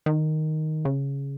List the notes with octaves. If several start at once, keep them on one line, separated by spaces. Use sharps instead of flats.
D#3
C#3